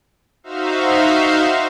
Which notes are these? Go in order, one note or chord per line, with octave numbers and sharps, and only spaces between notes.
D#4 F#4 C5 E5 F5